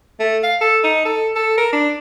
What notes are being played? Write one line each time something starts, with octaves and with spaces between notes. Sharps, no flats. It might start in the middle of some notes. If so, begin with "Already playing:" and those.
A3
F5
A4
D#4
A4
A4
A#4
D4